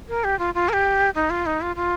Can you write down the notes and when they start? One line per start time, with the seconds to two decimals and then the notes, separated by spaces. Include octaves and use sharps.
0.09 A#4
0.24 G4
0.39 F4
0.54 F4
0.69 A#4
0.73 G4
1.15 D#4
1.30 F4
1.46 D#4
1.61 F4
1.76 F4